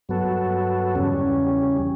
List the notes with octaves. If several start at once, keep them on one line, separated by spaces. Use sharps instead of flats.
G2 F#3 B3 F#4 A4
E2 C#3 G3 C#4